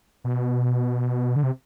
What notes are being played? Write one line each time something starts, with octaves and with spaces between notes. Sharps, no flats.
B2
D3
C3